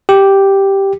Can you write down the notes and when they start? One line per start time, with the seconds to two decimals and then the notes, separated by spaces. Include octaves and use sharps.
0.09 G4